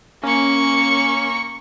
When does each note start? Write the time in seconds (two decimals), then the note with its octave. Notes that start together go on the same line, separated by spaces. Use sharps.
0.23 A#3 C#4 C#6